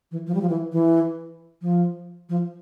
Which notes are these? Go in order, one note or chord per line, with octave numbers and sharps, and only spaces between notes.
E3
F3
G3
F3
E3
E3
F3
F3